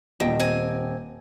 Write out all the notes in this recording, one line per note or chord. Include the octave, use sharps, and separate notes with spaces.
D#1 E2 D#5 G5
C4 G#5